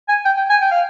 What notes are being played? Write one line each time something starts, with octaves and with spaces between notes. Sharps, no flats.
G#5
G5
G5
G#5
G5
F5